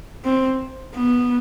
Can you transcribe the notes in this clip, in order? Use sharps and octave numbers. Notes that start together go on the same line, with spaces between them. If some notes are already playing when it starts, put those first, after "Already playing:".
C4
B3